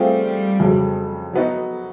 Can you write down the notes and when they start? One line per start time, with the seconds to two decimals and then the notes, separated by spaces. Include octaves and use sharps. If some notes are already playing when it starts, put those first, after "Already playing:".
Already playing: G3 A3 C4 F4 G#4
0.60 F2 C#3 F#3
1.33 F#3 B3 D#4 F#4